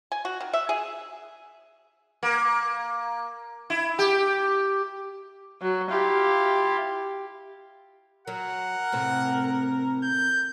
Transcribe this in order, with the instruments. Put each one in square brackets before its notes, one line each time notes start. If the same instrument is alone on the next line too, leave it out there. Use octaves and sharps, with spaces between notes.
[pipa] G#5
F#4
D#3
E5
G#4
[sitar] A#3
E4
G4
[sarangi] F#3
[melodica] E4 F4 F5 [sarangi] G4
[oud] F#3 [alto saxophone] A#4 [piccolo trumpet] F#5
[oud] A2 C3 C4
[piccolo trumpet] G6